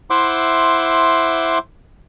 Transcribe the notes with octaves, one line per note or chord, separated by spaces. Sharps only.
E4 C5 E5 F#5 C6 D6